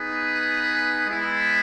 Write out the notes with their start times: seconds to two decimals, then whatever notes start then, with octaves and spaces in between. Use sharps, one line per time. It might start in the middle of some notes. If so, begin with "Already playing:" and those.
Already playing: B3 D#4 G#4 B4
1.07 G#3 B3 E4